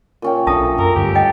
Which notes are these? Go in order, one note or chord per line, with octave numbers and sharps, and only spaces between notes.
A#2 C#4 G5
B1 D4 A4 E5 A5 D#6
F#2 A4 A#4
D2 G2 G3 G4
D#5 F#5 G5